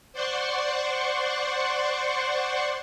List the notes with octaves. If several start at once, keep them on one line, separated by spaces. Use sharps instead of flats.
C5 D5 F#5 C6 C#6